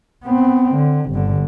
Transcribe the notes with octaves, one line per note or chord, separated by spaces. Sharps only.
B3 C4
D3
G1 D3